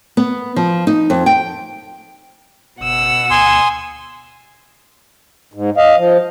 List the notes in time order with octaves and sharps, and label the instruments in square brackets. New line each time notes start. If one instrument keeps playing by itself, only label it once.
[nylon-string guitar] B3
F3
D#4
F2
G5
[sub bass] F#1 [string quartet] B2 F#5 E6
[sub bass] D2 [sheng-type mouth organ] G#5 C6 D#6
[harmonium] G#2
D#5 F5
F3